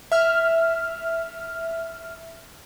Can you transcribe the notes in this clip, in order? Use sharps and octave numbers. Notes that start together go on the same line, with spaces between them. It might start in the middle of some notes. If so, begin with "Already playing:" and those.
E5 F6